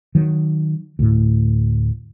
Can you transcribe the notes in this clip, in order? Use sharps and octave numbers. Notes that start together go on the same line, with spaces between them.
D#3 F#3
D2 A2